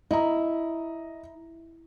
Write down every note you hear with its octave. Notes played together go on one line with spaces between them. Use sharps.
E4 D#5 A#5